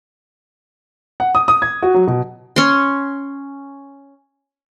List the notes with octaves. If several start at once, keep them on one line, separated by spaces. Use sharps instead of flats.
F#5
D#6
D#6
G#6
F#4
F#3
B2
C#4 C6